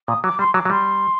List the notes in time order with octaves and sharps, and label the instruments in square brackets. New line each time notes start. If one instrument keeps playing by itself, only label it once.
[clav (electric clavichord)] A#2 [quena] D#6
[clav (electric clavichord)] F#3 [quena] D6
[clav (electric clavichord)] G3 [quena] C6
[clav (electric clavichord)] F#3 [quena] D6
[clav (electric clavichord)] F#3
[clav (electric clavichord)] G3 [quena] C6